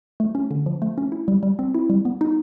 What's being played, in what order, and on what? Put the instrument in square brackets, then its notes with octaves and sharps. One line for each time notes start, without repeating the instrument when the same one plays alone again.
[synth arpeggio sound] A3
C#4
D3
F3
A3
C#4
E4
G3
G3
C4
E4
G3
B3
D#4